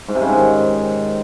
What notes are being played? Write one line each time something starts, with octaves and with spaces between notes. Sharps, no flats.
G#2
C3
C#3
G#2
D#3